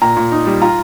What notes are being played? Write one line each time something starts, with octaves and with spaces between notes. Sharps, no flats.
A#2 A#5
A#2
D#4
G3
F4 A#5